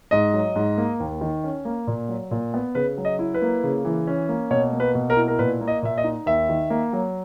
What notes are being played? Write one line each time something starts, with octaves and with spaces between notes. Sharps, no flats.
G#2 D#5
F#3
G#2
A#3
D#2
D#3
C#4
A#3
A#2
F#3
A#2
B3
C#3 B4
F#3
D#5
E4
B4
A#3
C#3
E3
C#4
A#3
B2 C#5
A#3
B4
B2
A#4
E4
A#4
A#2 B4
A#3
D#5
A#2 E5
D#5
D#4
D#2 E5
D#3
A#3
F#3